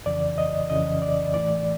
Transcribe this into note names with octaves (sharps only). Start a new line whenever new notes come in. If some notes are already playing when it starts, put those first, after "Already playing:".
F2 C#3 E3 D5
D#5
F2 C#3 E3 D#5
D5
A2 E3 A3 D5